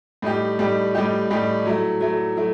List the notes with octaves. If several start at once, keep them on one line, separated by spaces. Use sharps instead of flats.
A2 G3 D#4 G4
A2 G3 D#4 G4
A2 G3 D#4 G4
A2 G3 D#4 G4
F#3 A3 E4
F#3 A3 E4
F#3 A3 E4